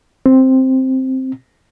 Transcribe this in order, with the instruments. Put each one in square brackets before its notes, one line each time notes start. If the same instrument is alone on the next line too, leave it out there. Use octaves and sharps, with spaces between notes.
[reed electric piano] C4